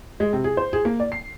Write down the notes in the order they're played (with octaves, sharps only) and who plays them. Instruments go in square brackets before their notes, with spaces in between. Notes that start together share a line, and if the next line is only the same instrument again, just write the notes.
[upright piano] G#3
C3
G#4
C5
G#4
A#3
D5
C7